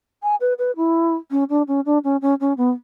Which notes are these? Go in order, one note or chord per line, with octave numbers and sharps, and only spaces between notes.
G#5
B4
B4
E4
C#4
D4
C#4
D4
C#4
C#4
C#4
B3